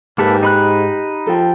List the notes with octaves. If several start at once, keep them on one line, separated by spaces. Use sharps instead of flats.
G#2 A#3 G4 A4 B4
D#4 B5 F#6
F3 A4 G5